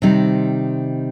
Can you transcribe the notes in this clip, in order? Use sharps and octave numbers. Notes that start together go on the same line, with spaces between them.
C3 D#3 G3 C4 D#4